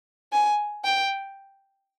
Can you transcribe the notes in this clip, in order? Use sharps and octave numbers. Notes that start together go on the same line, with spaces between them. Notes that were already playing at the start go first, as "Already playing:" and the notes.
G#5
G5